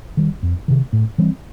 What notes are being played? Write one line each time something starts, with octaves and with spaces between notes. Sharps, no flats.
D#3 G3
F2
C3 D#3
A2
E3 G3 C4